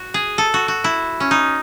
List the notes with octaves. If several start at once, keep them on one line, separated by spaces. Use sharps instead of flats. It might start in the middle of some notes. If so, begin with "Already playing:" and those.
Already playing: F#4
G#4
A4
F#4
F#4
E4
C#4
D#4